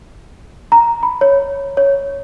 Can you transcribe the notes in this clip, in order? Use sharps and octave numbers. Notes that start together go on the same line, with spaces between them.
A#5
B5
C#5
C#5